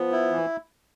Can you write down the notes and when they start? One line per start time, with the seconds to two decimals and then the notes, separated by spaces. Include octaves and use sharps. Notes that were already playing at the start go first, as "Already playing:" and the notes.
Already playing: F3 B3
0.12 E4
0.31 E3